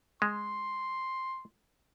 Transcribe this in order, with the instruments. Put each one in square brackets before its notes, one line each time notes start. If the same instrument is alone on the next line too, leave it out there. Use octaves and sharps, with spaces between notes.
[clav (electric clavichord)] G#3 [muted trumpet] C6